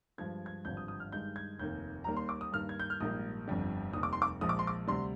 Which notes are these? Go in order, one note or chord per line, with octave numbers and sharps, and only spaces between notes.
G2 F3 G#3 G#6
G#6
G#1 G2 D3 F3 G6
D#6
D#6
F6
G2 D#3 G#3 G6
G#6
F1 D#2 D#3 A#3 G6
D#2 D#3 G3 A#3 A#5
C6
D6
D#6
G2 D#3 A#3 F6
G#6
G6
F6
A#1 G#2 G3 A#3 D#6
G1 F2 D3 G3
F1 D#2 D#3 G3 D#6
D6
C6
D6
A#1 A#2 F3 G#3 D#6
D6
C6
D6
D2 C3 G3 C6